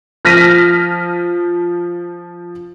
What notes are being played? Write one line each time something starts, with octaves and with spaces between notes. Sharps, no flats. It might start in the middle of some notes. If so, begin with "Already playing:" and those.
F3 F6 A#6 B6 D#7